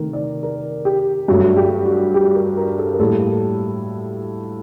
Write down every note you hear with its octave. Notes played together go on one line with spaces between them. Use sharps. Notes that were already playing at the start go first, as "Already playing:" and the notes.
Already playing: C3 D#3 A3 A#4
D5
A#4
G4
G2 F#3 A3 F#4
G4
F#4
G4
A#4
A#4
A4
A#4
A2 G3 A#3 A4